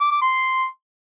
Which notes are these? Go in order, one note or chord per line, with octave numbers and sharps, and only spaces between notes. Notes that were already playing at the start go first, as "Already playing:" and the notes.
D6
D6
C6